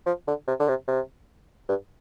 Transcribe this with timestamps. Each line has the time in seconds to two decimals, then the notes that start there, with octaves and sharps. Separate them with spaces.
0.06 F3
0.28 D3
0.48 C3
0.60 D3
0.68 C3
0.88 C3
1.69 G2